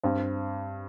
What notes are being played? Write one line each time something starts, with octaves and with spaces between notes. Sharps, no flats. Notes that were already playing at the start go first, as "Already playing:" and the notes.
G2 C4